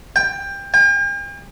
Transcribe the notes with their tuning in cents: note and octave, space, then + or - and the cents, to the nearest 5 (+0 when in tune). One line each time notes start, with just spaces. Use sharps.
G5 +20
G5 +45